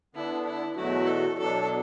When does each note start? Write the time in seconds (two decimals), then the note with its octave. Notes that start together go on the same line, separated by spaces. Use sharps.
0.15 D3 B3 D4 E4
0.46 E4
0.76 E2 B2 F#3 A3 E4 F#4
1.07 A4
1.38 B2 F#3 D4 A4